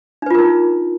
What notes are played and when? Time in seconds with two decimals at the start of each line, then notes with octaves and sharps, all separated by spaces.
0.22 D4
0.26 B4
0.30 F4
0.35 A#4
0.39 D#4